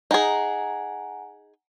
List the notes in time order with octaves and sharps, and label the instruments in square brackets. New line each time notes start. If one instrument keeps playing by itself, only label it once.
[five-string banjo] D#4 G#4 [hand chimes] F#5 G#5 A#5